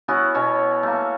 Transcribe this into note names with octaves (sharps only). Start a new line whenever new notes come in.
B3 C#4 E4 F#4
B2 C#4 C#5
A3 A#3